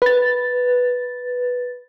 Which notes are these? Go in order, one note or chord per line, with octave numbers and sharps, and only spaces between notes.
B4 A6